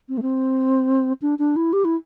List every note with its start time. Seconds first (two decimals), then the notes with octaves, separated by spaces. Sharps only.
0.09 C4
0.17 A3
0.22 C4
1.22 D4
1.39 D4
1.56 E4
1.73 G4
1.85 E4